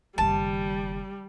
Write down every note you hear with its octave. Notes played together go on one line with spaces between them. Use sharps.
F#1 D#3 G3 A5